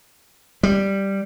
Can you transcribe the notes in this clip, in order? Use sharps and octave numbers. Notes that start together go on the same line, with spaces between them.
G3